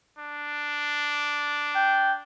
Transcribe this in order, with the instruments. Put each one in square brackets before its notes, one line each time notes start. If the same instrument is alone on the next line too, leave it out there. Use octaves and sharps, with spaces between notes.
[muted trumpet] D4
[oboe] G5